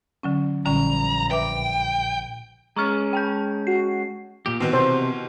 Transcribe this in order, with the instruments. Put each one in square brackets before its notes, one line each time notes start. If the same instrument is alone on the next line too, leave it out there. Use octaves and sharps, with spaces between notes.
[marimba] D3 F#3 C#4
[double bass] A#1 [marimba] D3 G3 C#4 [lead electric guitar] A#5
[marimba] B4 E5 D6 [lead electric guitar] G5
[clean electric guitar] G#3 C#4 [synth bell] A#5 C#6 F6
[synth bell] G5 A5 G6
[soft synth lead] F#4 [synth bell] C7
[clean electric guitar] A#2 G4
[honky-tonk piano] B2 D#3 E3 [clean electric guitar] C4
[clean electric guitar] C3 [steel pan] C5